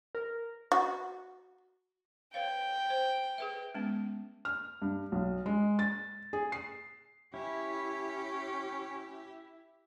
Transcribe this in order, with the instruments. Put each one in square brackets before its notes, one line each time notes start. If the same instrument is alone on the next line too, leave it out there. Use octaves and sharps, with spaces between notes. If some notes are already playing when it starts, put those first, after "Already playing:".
[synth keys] A#4
[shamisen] F#4
[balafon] B4 C#5 F5 [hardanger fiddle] G5
[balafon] C5
G#4 B4 E5
G#3 B3 C#4
[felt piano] F6
G2
B1
G#3
A6
G#4
C7
[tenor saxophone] C#4 [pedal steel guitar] E4 [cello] G4